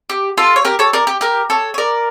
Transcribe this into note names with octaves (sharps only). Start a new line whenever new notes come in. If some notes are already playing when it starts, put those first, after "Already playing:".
G4
F4 A4
C#5
G4 A#4
A4 C#5
A#4 D5
G4
G4 A#4
A4 C#5
C#5
A#4 D5